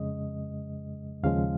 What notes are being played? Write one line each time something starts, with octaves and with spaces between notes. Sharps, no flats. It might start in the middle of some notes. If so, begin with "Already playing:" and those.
Already playing: F2 C#3 G#3 D#5
D#2 C#3 F3 G#3 F5